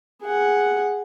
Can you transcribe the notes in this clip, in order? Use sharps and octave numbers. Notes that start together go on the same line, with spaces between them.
G#4 F#5